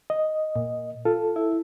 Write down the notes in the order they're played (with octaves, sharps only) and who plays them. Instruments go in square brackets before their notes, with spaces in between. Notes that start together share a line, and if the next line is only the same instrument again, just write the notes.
[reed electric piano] D#5
[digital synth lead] A#2
[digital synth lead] F4 [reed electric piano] A4
[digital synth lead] E4